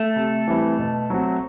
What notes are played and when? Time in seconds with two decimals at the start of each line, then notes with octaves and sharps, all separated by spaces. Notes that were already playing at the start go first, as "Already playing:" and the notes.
Already playing: A3 A4
0.16 C3
0.48 E3 G3 C4 E4
0.79 B2
1.10 F#3 C4 F#4